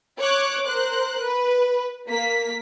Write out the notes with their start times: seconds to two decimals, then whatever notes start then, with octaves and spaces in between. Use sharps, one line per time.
0.20 C#5 D6 F#6
0.68 A#4 C5 F#6
1.26 B4
2.09 A#3 B6